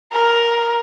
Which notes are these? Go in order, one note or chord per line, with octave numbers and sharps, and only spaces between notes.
A#4